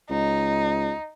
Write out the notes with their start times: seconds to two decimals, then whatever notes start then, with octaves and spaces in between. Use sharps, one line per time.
0.10 C#2 D#4